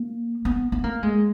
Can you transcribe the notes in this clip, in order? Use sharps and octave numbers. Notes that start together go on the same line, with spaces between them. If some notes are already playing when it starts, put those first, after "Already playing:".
Already playing: A#3
B3
B3
A#3
G#3